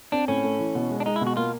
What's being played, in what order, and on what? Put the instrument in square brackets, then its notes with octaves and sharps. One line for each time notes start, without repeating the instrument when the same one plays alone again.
[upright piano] C4 [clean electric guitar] D4
[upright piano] A2 [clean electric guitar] C#4
[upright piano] A3
E3
B2
G#3
[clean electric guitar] D4
[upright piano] G#3 [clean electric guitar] D#4
[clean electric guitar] E4
[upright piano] B2
[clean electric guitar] F#4
[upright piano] A#3 [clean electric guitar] F4